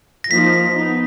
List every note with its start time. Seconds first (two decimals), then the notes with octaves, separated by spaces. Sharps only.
0.24 A#6
0.31 F3 A#3 D#4 B6
0.76 B3 D#4